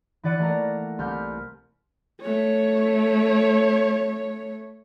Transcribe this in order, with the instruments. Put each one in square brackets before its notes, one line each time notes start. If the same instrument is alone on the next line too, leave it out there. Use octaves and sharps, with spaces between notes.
[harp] E3 E4 D5 F#5 D#7
A3 A#3 A#4
C2 F6 G6
[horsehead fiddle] A3 C#5